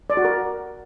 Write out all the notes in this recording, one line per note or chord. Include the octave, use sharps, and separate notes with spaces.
D5
F#4
A#4